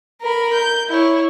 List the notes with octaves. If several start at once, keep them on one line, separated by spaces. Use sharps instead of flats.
A#4 B5
G6
E4 C#5